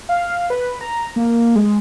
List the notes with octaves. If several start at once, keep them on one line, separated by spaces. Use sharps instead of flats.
F5
B4
A#5
A#3
G#3